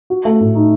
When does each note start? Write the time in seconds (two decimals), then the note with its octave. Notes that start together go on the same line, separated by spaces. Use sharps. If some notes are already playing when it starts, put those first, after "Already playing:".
0.10 F#4
0.25 A3
0.41 A2
0.55 D#4